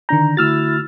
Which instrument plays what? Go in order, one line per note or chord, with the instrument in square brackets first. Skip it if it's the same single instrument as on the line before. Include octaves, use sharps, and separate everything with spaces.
[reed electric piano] D3 D4 G6 [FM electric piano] D#3 A#5
[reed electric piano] D3 A3 F#4 [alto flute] E4 [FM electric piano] E6 F6 A6